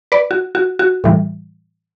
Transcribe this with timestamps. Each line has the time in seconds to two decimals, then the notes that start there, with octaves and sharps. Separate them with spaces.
0.12 B4 D5
0.31 F#4
0.55 F#4
0.79 F#4
1.04 A2 E3 G3